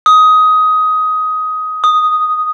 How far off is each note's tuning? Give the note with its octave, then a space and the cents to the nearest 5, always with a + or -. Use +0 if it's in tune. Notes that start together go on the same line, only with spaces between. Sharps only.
D#6 +15
D#6 +0